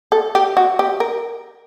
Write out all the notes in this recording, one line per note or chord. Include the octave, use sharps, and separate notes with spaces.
A4
G4
F#4
G4
A#4